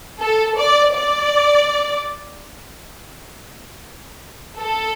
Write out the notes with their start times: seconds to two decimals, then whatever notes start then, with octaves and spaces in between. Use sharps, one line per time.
0.21 A4
0.57 D5
0.93 D5
4.58 A4